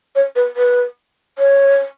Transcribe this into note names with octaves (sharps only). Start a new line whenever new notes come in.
C#5
B4
B4
C#5